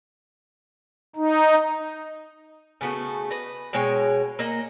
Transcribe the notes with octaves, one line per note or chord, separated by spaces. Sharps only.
D#4
C#3 A3 B3 F#4
B4 D#5
B2 G#3 C#5 G5
A#3 D#5 F#5